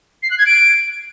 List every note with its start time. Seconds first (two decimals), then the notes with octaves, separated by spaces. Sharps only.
0.23 C7
0.30 F#6
0.38 G#6
0.46 D7